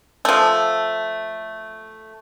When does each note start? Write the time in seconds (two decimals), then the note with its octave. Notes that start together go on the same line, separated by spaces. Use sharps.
0.25 F3 A3